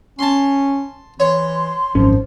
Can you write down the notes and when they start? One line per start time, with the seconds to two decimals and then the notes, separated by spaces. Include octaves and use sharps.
0.19 C#4 A5 C6
1.20 E3 C#5 C6
1.95 G#1 F#2 F3 C#4